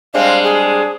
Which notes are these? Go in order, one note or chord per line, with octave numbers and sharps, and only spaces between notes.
G3 G#3 C4 D4 F5
G#4